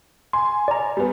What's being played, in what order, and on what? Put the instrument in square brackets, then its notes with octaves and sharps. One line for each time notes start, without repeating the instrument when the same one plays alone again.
[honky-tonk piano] G#5 [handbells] C6
[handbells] D5 A#5
[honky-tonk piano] G3 B3